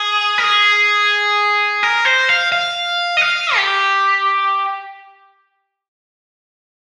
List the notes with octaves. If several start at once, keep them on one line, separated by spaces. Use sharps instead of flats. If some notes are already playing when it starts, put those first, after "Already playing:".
Already playing: G#4
A#4
G#4
A#4
C5
F5
F5
D#5
F5
G4